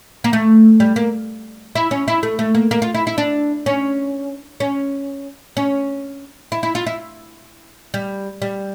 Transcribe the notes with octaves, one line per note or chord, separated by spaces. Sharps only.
A#3
A3
G3
A#3
E4
C#4
E4
A3
A3
A#3
A#3
F4
E4
E4
D4
C#4
C#4
C#4
E4
E4
F4
E4
G3
G3